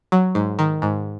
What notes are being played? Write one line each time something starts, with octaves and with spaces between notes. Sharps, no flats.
F#3
G#2
D#3
G#2